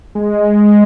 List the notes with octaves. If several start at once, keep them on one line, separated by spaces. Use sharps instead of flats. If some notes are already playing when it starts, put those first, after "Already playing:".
G#3